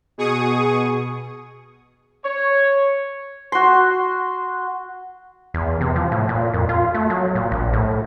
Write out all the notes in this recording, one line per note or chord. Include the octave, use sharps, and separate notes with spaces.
B2 G#4 C#6 D#6
C#5
F#4 C6
E2
C3
F3
A2
A#2
F2
F4
A3
F#3
A#2
A#1
A2